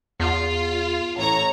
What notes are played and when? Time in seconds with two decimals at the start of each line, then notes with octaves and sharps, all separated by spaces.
0.20 E2 F4
1.17 A1 C#5 A#5